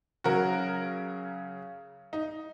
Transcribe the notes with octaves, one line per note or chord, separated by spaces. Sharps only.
C#3 F#3 C#4 F#4 A#4
D#4